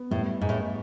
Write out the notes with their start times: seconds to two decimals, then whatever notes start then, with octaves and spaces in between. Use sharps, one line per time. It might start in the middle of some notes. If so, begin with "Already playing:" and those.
Already playing: B3
0.11 A2 G3
0.41 G#2 B3
0.49 A2